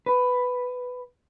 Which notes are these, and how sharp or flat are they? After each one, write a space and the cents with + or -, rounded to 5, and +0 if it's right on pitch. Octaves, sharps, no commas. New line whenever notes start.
B4 +10